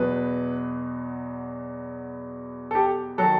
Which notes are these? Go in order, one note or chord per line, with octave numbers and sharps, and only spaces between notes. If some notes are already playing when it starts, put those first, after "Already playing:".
Already playing: E2 B2 F#3 B4
A4
G4
D#3 F#3 A4